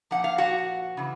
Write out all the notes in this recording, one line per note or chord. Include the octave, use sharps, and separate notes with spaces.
A#2 F3 F#5
F5
F#4 F#5
C#3 E3